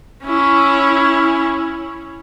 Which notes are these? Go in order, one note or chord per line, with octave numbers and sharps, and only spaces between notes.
C#4 E4